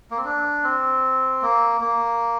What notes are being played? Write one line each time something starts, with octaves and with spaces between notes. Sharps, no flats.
A#3
C4
D4
C4
A#3
A#3